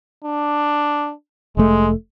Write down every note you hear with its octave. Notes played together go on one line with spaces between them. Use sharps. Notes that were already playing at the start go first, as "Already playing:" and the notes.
D4
F1 G#3 A3